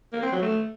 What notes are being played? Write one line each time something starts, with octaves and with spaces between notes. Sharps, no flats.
A#3
C4
F#3
A3